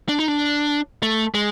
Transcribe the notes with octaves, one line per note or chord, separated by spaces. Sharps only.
D4
D#4
D4
A3
G#3